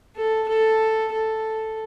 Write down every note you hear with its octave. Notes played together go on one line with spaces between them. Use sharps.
A4
A4
A4